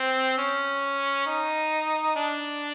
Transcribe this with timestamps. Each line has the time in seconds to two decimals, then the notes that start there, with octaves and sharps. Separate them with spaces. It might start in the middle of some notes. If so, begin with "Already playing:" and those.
Already playing: C4
0.38 C#4
1.27 D#4
2.16 D4